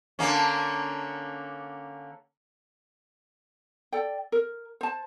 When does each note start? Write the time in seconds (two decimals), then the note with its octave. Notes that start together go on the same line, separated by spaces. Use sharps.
0.19 D3 A#3 C#4
3.92 A4 D5 G5
4.32 A#4
4.81 C5 A5